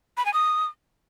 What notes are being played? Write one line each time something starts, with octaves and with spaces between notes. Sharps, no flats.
B5
G#5
D#6